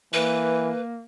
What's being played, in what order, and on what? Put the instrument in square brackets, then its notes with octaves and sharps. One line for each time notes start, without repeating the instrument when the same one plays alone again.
[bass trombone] E3 [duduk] A#3 [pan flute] B4